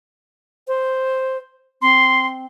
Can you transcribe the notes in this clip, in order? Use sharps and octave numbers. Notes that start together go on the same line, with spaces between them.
C5
C4 C6